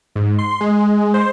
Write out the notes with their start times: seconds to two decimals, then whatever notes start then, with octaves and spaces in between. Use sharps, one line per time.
0.16 G#2
0.39 C6
0.61 G#3
1.14 C5